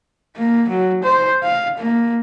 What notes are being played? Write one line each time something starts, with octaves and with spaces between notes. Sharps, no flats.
A#3
F#3
C5
F5
A#3